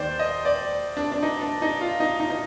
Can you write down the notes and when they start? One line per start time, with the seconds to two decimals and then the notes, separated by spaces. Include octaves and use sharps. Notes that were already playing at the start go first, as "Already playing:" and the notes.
Already playing: D#2 D#3 C5 D5
0.19 D#5
0.45 D5
0.97 D4
1.12 D4
1.23 D#4
1.42 D4
1.62 D#4
1.81 F4
2.00 D#4
2.20 D#4
2.30 D#4